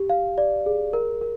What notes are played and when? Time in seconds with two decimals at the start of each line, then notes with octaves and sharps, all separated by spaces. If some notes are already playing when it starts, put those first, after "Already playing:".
Already playing: G4
0.10 F5
0.38 D5
0.66 G#4
0.93 A#4
1.21 A#4